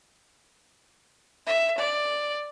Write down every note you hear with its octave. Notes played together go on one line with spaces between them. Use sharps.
E5
D5